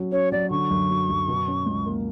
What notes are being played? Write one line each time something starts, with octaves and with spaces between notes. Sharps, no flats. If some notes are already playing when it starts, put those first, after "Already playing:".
Already playing: F#3 C#4
C#4 C#5
F#3 D5
D3 C#6
F#2
F#3
F#2
B2
C#4
C#2
A#3